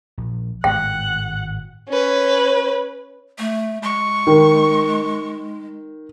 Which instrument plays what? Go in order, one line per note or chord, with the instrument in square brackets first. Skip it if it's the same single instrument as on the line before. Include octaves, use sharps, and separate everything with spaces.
[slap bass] A#1
[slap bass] G#1 A2 G#3 [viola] F#5 [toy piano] G5
[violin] C#4 B4
[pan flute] A3
[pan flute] G#3 [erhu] C#6
[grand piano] D#3